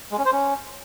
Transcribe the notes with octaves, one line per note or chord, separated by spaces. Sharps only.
G#3
C#4
C5
C#4